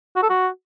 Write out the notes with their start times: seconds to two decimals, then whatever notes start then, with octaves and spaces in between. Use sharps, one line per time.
0.16 F#4
0.23 A4
0.30 F#4